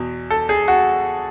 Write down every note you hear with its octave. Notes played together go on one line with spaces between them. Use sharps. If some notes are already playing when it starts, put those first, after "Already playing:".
Already playing: E2 B2
A4
G#4
F#4